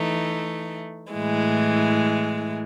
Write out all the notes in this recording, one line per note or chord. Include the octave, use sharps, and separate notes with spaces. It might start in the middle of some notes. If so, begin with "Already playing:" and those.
Already playing: E3 A3 D#4
A2 E3 G#3